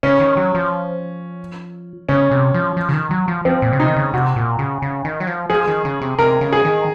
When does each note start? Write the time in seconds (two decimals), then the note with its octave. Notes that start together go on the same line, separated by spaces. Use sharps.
0.03 C#3 C#4
0.20 D#3
0.37 F#3
0.55 F3
2.09 C#3 C#4
2.31 C3
2.54 F3
2.77 F3
2.89 C#3
2.94 D#3
3.11 F#3
3.28 F3
3.45 F3 C4
3.62 A#2
3.73 C#3
3.79 C3 D#4
3.88 D#3
3.96 C#3
4.13 C3 F#4
4.36 A#2
4.59 C#3
4.82 C#3
5.05 D#3
5.20 F#3
5.27 F3
5.50 F3 G#4
5.68 D#3
5.85 C#3
6.02 C3
6.19 C3 A#4
6.41 C#3
6.53 G#4
6.65 D#3